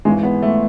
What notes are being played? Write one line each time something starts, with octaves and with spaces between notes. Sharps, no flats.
G#1 G#2 E3 G#3
B3
A3